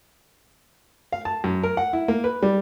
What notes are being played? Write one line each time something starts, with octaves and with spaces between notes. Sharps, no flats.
F5
A5
F#2
A#4
F#5
E4
A#3
B4
G3